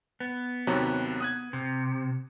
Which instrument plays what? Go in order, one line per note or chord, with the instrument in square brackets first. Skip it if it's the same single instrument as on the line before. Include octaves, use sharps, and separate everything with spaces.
[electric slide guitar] B3
[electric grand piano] D#2 C3 F#3
D#6 F#6 G#6
[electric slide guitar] C3